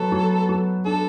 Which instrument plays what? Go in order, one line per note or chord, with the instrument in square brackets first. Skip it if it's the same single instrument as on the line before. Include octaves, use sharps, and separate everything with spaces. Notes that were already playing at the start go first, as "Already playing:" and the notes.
Already playing: [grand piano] F#3 B3 [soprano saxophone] A4
[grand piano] F#3
F#3
[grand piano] D4 [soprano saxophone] A4